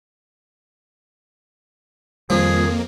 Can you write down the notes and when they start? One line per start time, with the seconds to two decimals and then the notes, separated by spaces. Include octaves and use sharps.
2.30 F2 D#3 F3 G3 A#3 G#4